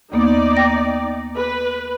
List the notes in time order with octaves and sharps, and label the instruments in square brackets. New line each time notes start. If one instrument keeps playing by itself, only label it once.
[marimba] D#2 A#3 B3 [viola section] D#4 D5
[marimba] G5 A#6
[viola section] B4